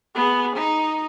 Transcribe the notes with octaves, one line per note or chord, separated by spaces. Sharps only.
B3 G#4
D#4